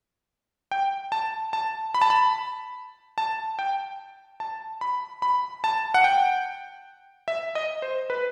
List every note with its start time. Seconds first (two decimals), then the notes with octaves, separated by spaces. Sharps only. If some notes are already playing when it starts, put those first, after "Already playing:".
0.71 G5
1.12 A5
1.53 A5
1.94 B5
2.02 A5
2.10 B5
3.18 A5
3.59 G5
4.40 A5
4.81 B5
5.22 B5
5.64 A5
5.94 F#5
6.04 G5
7.28 E5
7.55 D#5
7.82 C5
8.10 B4